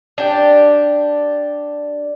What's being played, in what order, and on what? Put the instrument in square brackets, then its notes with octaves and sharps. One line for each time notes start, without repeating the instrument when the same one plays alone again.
[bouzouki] D4 G4